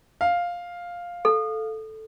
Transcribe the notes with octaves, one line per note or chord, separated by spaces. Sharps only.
F5
A4